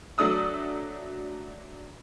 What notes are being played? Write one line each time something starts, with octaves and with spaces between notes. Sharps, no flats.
F#3 A3 D4 D#6 E6